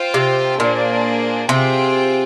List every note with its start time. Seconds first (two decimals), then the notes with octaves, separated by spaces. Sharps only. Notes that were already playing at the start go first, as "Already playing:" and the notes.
Already playing: F4 C5 G5
0.14 C3
0.59 A#2 A#3 D4 G#4 C5
1.49 C3 F4 G#4 C5 G5